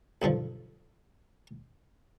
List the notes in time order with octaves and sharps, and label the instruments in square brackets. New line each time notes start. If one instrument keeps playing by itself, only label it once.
[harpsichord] B1 G2 D3 F3